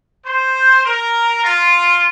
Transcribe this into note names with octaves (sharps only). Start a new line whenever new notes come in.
C5
A#4
F4